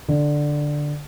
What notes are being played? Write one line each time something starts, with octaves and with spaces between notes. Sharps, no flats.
D3